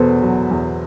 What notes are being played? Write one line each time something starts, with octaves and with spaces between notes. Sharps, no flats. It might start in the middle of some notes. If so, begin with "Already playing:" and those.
Already playing: E2 B2 A4 B4 C5
F#3
E2